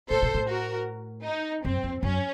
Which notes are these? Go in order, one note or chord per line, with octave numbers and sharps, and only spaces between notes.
A2 A4 C5
A#2
A2
F#4 A#4
D#4
F#2 C4
F2
F#2 C#4